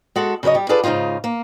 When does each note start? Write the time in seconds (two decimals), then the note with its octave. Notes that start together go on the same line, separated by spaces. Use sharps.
0.16 G#3 F#4 A4
0.43 C#3 F#3 B4 C#5 D#5
0.55 G3
0.69 F4 G#4 A4 B4 D5
0.84 G#2 C#3 F#3 D#4 F4
1.24 A#3